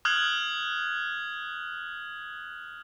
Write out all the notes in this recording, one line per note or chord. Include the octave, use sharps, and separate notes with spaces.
D#6 F6 F#6 G#6 F#7